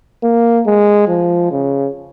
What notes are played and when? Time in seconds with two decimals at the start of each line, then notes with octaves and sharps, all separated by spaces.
0.23 A#3
0.66 G#3
1.08 F3
1.51 C#3